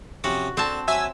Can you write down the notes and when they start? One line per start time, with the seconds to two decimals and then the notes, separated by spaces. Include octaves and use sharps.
0.24 C3 F3 C#4 F#4
0.57 D3 C4 A5
0.88 F#3 E5 G#5 E6